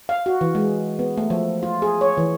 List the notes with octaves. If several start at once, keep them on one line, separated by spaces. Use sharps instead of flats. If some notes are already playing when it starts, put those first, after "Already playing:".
F5
F#4
E3
G#3
B3
A3
F3
F4
G#4
C#5
E3